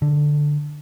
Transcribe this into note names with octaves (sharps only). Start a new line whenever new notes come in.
D3